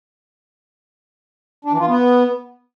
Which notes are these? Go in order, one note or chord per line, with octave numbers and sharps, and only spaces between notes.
D4
E3
F4
B3